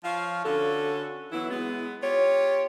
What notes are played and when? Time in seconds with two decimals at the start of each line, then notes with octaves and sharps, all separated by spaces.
0.04 F3 C#5 F5
0.45 D3 C#4 F#4 A4
1.32 E3 F#3 B3 E4
1.50 G#3 B3
2.02 F4 G4 C#5